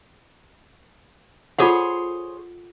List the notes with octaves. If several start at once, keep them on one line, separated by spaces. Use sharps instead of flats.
F4 G#4 A4 C5 C#5 F#5